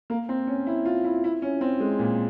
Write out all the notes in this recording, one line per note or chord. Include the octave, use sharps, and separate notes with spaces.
A#3
C4
C#4
E4
F4
E4
E4
C#4
C4
G#3
A#2